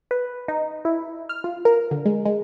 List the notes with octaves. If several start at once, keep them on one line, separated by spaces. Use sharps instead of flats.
B4
D#4
E4
F6
F4
A#4
D3
G#3
G#3